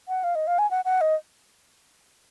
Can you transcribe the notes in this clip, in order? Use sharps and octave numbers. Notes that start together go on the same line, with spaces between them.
F#5
F5
D#5
F5
G#5
F#5
F#5
D#5